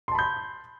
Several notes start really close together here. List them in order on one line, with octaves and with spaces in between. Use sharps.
C6 A5 B5 G6